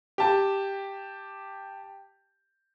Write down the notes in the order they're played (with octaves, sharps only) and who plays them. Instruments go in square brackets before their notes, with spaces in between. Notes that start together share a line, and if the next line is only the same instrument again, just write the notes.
[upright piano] G4 A5